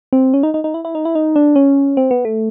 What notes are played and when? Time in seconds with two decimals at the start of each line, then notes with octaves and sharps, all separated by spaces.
0.13 C4
0.34 C#4
0.43 D#4
0.54 D#4
0.64 D#4
0.74 E4
0.85 E4
0.95 D#4
1.05 E4
1.15 D#4
1.36 D4
1.56 C#4
1.97 C4
2.11 B3
2.25 A3